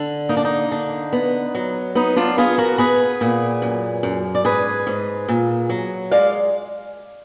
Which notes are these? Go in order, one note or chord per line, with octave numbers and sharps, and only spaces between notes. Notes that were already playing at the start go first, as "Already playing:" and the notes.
Already playing: D3
A#3 D#4
D4
D#4
D3
B3
F#3
B3 D#4
D4 F4
B3 F4 G#4
F#4 A#4
B3 G#4 B4
A#2
F#2
F#2
D5
G#2 G#4 B4
G#2
A#2
F#3
G#3 D5 F5